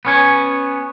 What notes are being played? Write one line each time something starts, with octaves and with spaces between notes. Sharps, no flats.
B3 C#4 C#5